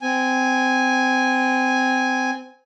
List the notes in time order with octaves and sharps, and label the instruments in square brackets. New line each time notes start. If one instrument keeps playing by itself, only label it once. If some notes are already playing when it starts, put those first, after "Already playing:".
[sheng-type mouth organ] C4 G#5